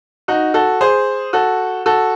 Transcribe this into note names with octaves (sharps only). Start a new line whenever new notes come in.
D#4 F#4
F#4 A4
G#4 C5
F#4 A4
F#4 A4